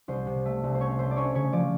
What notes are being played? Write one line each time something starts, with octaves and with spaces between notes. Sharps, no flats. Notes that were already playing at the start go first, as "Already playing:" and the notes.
C2 C5
C3
A3
C2
C5
C#4 C#5
A3 C5
D5
C#4 C#5
C#3 C#5
F3 D5